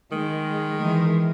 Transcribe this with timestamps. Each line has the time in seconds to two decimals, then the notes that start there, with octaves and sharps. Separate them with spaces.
0.12 D#3 G#3
0.80 E3 G#3